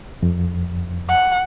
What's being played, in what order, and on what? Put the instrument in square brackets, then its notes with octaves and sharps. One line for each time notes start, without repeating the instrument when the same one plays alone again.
[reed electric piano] F2
[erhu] F#5